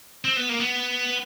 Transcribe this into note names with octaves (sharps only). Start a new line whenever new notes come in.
C4
B3
A#3
B3